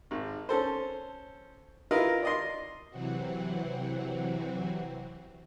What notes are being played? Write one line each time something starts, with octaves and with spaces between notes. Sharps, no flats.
G#1
C#4 A4 C5
E4 F4 A#4 B4 D#5
D5 D#5 C6
C3 E3 F#3 C4 F#4